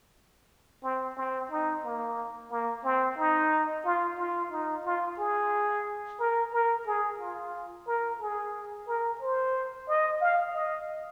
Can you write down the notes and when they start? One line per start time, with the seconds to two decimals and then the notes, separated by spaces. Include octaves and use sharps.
0.84 C4
1.17 C4
1.51 D#4
1.84 A#3
2.51 A#3
2.84 C4
3.18 D#4
3.85 F4
4.18 F4
4.52 D#4
4.85 F4
5.19 G#4
6.20 A#4
6.53 A#4
6.86 G#4
7.20 F4
7.87 A#4
8.20 G#4
8.87 A#4
9.21 C5
9.88 D#5
10.21 F5
10.54 D#5